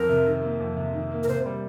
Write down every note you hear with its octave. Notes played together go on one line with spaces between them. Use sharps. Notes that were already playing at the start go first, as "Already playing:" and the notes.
Already playing: F2 C4 A#4
C3
D#3
A#3
F2
C3
D#3
A#3
A#4
C3 C5
G3